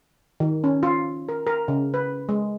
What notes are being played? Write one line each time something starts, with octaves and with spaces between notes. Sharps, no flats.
D#3
C#4
F4
A#4
A#4
C#3
B4
G#3